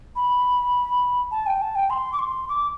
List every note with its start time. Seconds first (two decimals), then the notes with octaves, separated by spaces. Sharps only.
0.15 B5
1.31 A5
1.46 G5
1.61 A5
1.75 G5
1.90 C6
2.12 D6
2.19 C6
2.49 D6